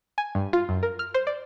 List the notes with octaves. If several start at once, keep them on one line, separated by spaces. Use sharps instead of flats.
G#5
G2
F4
F#2
A#4
F6
C5
D5